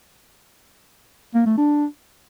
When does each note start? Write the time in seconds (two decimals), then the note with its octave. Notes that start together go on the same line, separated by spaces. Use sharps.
1.35 A#3
1.46 A3
1.58 D4